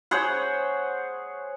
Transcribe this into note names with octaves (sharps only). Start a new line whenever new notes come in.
G#4 C5 C#5 F#5